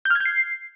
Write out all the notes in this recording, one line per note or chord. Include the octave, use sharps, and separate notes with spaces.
G6
F6
G#6
G6
C7